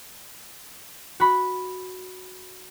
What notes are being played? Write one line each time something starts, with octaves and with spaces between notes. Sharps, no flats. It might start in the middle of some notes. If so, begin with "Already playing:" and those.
F#4 B5